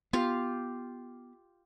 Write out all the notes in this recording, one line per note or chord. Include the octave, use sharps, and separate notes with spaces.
B3 F4 G4 F5